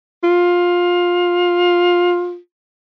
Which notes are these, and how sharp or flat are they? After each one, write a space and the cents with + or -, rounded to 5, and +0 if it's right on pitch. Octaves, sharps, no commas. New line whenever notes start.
F4 +15